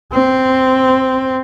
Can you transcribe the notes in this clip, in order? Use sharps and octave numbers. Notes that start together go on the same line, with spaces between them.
C4